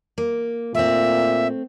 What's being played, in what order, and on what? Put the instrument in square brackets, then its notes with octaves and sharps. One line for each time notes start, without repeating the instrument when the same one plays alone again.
[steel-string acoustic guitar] A#3
[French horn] A#2 [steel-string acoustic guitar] A3 C4 [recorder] E5